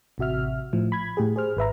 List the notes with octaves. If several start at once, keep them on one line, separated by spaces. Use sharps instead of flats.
A1 C3 F#4 E5 F6
A2 F3
B5 G#6
A2 G4 G#4
G#4 C5 F6
G#1 B4 E5 A#5